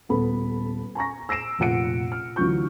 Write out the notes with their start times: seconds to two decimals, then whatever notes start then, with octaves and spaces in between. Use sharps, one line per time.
0.09 D#1 B3 A4 B5
0.95 G#5 A#5 C#6 A#6
1.29 E6 A#6 C7 D7 E7
1.59 F1 A#2 F4 F#5 C#7 D7
2.12 F6
2.36 D2 E3 F#3 F4 C#6 G6